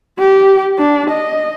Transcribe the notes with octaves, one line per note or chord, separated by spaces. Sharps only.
G4
D4
D#5